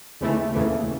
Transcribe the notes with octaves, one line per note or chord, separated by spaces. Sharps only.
D#2 C#3 E3 A3
D#2 C#3 E3 A3